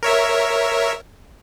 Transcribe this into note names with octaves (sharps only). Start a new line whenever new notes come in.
A#4 C#5 E5